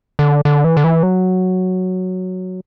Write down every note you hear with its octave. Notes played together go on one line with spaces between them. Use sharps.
D3
D3
E3
D3
E3
F#3